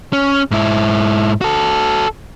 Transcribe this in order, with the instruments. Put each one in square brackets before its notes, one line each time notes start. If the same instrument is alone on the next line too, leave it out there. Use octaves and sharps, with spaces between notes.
[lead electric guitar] C#4
G#2 E4
F#4 A4